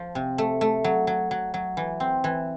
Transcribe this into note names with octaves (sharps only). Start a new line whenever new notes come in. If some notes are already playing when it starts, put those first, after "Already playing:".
Already playing: F3
C3
A3
A3
F#3
F#3
F#3
F#3
E3
C4
E3